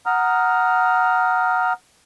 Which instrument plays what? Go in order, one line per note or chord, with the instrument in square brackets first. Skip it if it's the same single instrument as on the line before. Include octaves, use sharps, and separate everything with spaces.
[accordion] F#5 A#5 D#6 F6